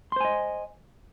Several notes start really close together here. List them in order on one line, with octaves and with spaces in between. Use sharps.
C6 C5 G#5 D#5